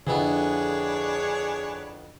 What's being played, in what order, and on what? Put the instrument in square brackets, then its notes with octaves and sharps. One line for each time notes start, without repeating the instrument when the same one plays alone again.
[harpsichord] F2 B3 E4 [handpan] D3 [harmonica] D4 B4 C#5 [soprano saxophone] G#4